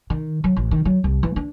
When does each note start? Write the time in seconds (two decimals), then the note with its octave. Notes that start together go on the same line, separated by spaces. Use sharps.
0.10 D#3
0.44 F#3
0.57 A1
0.71 D#3
0.85 F#3
1.04 C2
1.23 E3
1.36 D4